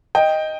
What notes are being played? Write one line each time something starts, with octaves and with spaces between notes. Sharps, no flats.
D#5 G5